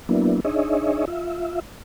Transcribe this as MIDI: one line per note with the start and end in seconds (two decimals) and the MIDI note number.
0.09 0.40 54
0.09 0.40 58
0.09 0.40 59
0.09 0.40 62
0.09 0.40 64
0.45 1.05 62
0.45 1.05 63
0.45 1.05 68
0.45 1.05 73
0.45 1.05 75
0.45 1.05 76
1.08 1.60 65
1.08 1.60 76